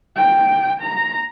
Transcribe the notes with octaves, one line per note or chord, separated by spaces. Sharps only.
G5
A#5